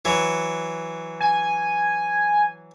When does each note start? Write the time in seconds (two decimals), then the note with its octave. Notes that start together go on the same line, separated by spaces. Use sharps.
0.05 E3 F#3
1.20 G#5